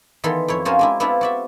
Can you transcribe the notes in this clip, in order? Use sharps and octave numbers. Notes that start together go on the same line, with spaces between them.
D#3 E3 B3 A4 C6
F2 E4 C#5
C#4 F4 F#4 G#4 A#4 C5
G#3 D4 E4
B3 C4 D4 E4 F4 B4
F#4 D5 E5